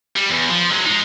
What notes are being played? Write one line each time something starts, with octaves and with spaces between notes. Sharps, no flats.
G3
E2
F3
F#3 G#3
G#3 D#4